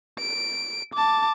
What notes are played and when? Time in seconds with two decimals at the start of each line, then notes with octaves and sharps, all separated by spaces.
0.19 D7
0.93 A5 D6